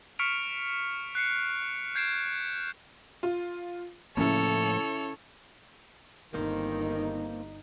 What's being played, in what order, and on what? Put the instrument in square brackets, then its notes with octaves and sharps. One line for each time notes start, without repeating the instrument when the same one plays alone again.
[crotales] C#6 F6 B6 C#7 D7 F7
F#6 C7 C#7
G6 G#6 C7 D7 E7
[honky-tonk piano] F4
[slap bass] A2 F3 A#3 [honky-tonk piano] C#3 E4 [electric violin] A4 C#5
[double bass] G1 D#4 [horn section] D#3 [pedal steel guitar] A#3 C4 C5